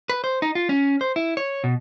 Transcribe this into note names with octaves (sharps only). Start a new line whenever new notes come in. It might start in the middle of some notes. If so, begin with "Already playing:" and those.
B4
C5
D#4
F4
C#4
C5
E4
C#5
B2